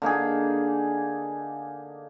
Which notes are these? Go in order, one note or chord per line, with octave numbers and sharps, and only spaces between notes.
D3 A#3 D#4 G#4